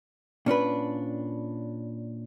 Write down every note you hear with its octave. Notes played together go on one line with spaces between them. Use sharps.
A#2 C#4 D4 B4